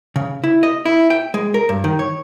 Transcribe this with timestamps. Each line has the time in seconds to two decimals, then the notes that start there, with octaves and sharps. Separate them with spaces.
0.16 C#3
0.44 E4
0.63 D#5
0.86 E4
1.10 G5
1.34 G#3
1.54 A#4
1.69 G2
1.84 D#3
1.99 C#5